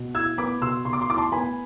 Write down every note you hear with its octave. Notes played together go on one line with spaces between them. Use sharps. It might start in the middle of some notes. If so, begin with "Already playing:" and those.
Already playing: B2
E4 E6 G#6
B3 B5 D6
B2 C6 E6
B2 C6
D6
C6
E4 D6
A5 C6
B3 G#5 B5